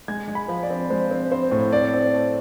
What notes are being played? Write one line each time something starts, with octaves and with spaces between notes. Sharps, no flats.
G#3 G#6
G#3
B5
F3
D5
C4
G#3 C5
C4
C4 C5
A2
C4 D5
C4
A3